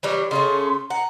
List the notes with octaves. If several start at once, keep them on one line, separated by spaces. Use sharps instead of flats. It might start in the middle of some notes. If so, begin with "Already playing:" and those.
E3 F#3 G3
C#3 A3 C#4 C6
F#5 A#5